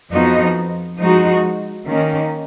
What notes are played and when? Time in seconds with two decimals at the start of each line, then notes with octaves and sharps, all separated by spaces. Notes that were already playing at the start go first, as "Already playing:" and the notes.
0.11 F2 F3 B3 D#4 F#4
0.98 F3 G#3 D#4 F#4
1.85 D#3 A#3 C#4